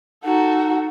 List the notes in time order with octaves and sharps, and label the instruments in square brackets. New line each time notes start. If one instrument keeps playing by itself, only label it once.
[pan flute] D#4 [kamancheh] F#4 A4